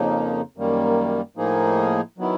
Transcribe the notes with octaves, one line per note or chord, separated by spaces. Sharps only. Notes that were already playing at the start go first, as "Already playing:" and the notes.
Already playing: F2 C#3 F3 A#3 D#4
F#2 D#3 G3 A#3
A2 F3 A#3 D#4 G#4
D#3 F#3 B3 E4